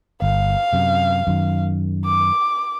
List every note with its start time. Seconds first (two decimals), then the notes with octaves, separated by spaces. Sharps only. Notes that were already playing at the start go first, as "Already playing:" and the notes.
0.22 G1 F5
0.73 F#2 C3
1.27 F#2 D#3
2.05 D6